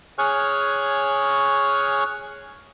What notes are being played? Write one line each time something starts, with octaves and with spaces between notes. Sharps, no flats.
G#4 C#5 G#5 C#6 F6 F#6